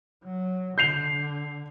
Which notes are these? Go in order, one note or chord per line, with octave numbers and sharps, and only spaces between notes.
F#3
D3 G6 C7 F7